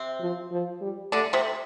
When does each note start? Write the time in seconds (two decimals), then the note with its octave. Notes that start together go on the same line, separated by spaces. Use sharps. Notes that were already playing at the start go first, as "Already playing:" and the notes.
Already playing: C3 C4
0.20 F3
0.51 F3
0.81 G3
1.12 D3 A3 D4
1.33 C3 C4